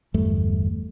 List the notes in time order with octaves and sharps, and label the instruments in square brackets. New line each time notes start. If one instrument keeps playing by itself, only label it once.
[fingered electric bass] G1 E2 G2 A3